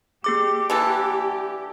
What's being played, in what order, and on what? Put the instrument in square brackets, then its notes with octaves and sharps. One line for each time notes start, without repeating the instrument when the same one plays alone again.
[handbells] A#3 G#4 D6 [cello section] G4
[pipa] D3 E3 A4 [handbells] G#5